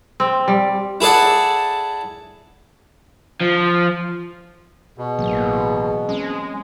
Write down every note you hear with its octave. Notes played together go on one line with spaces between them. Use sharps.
C4
G3
E4 G#4 A4 D5 F#5
F3
B2 G#4
A1 E3 F#3 A#3
G#3 C4 C#4